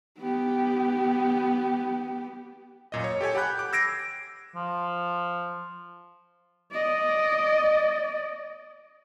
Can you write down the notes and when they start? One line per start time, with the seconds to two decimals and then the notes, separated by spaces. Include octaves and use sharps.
0.19 B3 G4
2.92 F#2 A#2 D#5
3.04 C#5
3.21 G4 A4 C#5 G#5
3.35 G4 F#5 B5 F#6 G6
3.59 D6
3.73 E6 G#6 A#6 C7 D7
4.56 F3
6.72 D5 D#5